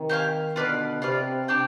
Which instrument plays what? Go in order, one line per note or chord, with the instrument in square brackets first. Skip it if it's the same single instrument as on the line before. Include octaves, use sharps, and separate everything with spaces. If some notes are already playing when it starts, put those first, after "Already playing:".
Already playing: [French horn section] C3 D#3
[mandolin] G4 C5 F5 G#5
[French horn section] B2 D3 [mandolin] F4 B4 D5 F5
[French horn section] C3 [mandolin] F4 B4 D5 F5
[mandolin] D4 G4 D5 G5